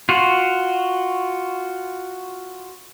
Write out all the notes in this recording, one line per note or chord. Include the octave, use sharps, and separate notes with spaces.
F4 F#4